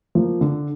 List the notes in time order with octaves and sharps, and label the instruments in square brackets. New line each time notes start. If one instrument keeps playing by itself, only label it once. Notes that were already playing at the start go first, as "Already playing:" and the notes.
[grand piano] F3 A#3
D3